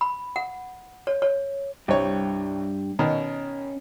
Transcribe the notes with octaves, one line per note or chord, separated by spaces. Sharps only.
B5
F#5
C#5
C#5
C2 G2 G4 C#5
B2 D#3 C#4